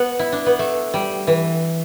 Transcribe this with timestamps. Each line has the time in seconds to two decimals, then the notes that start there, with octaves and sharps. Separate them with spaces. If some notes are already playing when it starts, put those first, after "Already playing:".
Already playing: B3
0.19 E4
0.32 D4
0.46 B3
0.59 A3
0.94 G3
1.27 E3